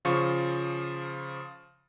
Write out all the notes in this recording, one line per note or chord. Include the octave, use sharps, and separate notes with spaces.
C#3 F3 F4 C#6 C#7